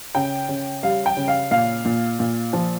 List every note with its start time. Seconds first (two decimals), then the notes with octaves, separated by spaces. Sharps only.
0.15 C#3 G5
0.49 C#3
0.83 G3 F5
1.06 G5
1.17 C#3
1.28 F5
1.51 A#2 F5
1.85 A#2
2.19 A#2
2.53 F3